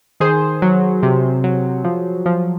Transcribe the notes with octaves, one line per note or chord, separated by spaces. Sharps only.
D#3 G#4 C5
F#3
C3
F#3
F3
F3